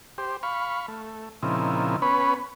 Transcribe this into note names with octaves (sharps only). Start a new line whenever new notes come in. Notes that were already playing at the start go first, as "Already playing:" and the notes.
G4 C5
F5 B5 C#6
A3
A#2 C#3 F3 C4 D#4 E4
B3 C#4 B4 C#5 B5